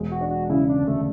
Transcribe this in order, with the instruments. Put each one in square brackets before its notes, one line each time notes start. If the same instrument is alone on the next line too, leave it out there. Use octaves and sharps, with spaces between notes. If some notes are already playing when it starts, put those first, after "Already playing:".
Already playing: [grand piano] E1 G#3
[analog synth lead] F#4
[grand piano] D4
[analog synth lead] F#4
[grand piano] C#3 [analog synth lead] E4
[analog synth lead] D4
[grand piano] D2
[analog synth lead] A3